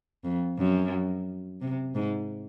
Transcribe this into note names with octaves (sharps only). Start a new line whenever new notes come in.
F2
F#2
C3
G#2